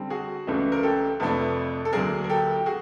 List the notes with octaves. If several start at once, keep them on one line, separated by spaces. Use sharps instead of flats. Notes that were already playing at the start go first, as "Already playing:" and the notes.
Already playing: D3 G3 C4
F#4 G#4
C#2 C#3 E3 A3 D4
A#4
G4 A4
F2 C3 F3 A3 D4 A4 B4
A4
D2 D3 F#3 A#3 D4 G#4 A#4
A#4
G4 A4
G4
F#4 G#4